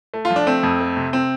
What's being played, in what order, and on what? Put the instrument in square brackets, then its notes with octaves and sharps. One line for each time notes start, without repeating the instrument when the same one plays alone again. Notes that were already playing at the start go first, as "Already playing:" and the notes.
[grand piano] A3
F4
F3
D4
A3 C4
F2
A3
C3
C4